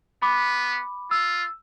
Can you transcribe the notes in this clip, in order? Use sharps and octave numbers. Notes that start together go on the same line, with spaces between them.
B3 B5 D6
F4 E6